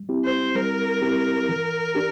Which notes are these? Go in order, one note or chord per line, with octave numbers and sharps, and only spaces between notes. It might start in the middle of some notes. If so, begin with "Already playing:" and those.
Already playing: G3
C4 E4 G4
C5
G3 A#4
C4 E4 G4
E3
D4 G4